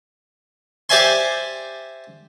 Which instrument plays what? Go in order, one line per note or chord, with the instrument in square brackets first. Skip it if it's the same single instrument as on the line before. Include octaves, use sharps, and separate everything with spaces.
[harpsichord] G4 C5 D5 E5 G#5 C6